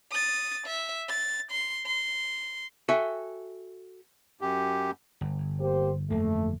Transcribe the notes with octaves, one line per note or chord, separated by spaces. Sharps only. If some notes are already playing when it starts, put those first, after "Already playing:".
D#6 A6
E5
A6
C6
C6
F#4 A4 E5 G5 G#5
F#2 G4
G1
A#3 G4 C5
G1 F2 A3 A#3